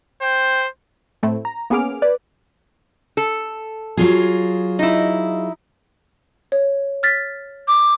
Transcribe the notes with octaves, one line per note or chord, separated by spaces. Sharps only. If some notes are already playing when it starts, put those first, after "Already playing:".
C5 G5
A2 A3 C4 E4
A#5
A#3 B3 C#4 G#4 D6 F6
B4 D5
A4
F#3 F4 G#4
D#4 E4
C#5
F6 A6 B6
D6